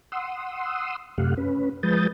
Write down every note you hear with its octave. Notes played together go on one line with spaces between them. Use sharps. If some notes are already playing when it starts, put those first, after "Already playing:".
F#5 C6 D#6 E6
F#2 C3 A3 G4 F5 F#5
C#4 B4
F3 G#3 B4 D#6 G6 A6